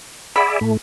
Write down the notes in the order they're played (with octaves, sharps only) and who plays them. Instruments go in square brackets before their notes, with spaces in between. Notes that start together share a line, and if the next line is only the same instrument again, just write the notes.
[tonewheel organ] G#4 D5 E5 [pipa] F#5 B5
[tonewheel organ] A2 A3